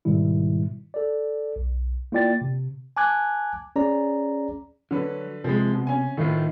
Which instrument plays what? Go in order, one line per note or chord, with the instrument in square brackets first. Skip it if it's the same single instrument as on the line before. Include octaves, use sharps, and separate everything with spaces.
[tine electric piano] G#2 B2 D#3 G3 E4
A4 D5
B1
A#3 E4 F4 D5 G5 A6
C3
G#5 A5 D6 F#6 G#6
C#4 G#4 D5 A#5
[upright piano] D3 B4 [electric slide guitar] F#3
[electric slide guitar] C3 [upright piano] F3 G#3
[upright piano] B2
C#4 G#5
[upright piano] A2 [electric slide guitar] D#3 D#4 F4